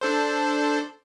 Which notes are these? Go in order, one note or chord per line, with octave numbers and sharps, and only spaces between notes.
D4 A4 C5